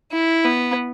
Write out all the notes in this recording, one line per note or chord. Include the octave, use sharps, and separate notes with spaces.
E4
B3